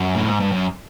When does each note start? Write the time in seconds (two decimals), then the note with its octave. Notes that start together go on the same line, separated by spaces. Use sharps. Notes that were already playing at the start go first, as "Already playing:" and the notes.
Already playing: F#2
0.15 A2
0.27 G#2
0.40 G2
0.52 F#2